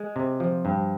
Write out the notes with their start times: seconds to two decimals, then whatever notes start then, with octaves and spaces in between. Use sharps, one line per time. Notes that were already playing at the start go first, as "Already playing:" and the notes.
Already playing: G#3
0.16 C3
0.40 F3
0.65 G2